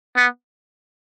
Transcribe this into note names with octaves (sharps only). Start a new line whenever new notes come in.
B3